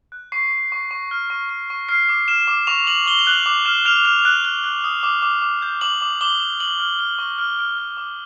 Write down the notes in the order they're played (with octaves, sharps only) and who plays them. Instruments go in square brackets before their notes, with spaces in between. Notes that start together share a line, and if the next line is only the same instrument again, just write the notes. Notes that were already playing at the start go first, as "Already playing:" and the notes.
[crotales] F#6
C#6 C7
C#6
C#6
C#6
F6
C#6
C#6
C#6
F6 C7
D6
F6 E7
D6
C#6 F7
C#6 F#7
C#6 G7
F7
F#6 F#7
D6
F6 E7
F6 F7
F6 F7
F#6
F#6
F#6
D#6
D6
D6
D6
G6
D6 F#7
D6
D6 G7
D6
C#6 F#7
F6
F6 F#7
C#6
F6
F6
F6
D6